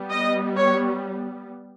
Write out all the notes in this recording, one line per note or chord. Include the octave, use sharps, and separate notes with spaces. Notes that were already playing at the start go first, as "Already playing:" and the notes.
Already playing: G3 B3
D#5
C#5